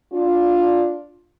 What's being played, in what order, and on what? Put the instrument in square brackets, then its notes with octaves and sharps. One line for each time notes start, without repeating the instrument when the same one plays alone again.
[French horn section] D4 F4